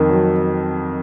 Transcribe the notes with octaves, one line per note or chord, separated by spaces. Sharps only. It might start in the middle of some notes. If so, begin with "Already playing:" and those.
Already playing: F2 D#3
F#3